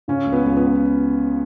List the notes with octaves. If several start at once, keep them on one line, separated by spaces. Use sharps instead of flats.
C#3 C#4
C#2
B3
C#2
B3